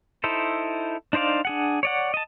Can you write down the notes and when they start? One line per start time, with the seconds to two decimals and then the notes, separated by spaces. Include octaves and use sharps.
0.24 D#4 E4 A4 C5
1.13 D4 D#4 C5 D5 F5
1.45 D4 G#4 F#5
1.83 C#5 D5 F#5
2.14 D#5 A5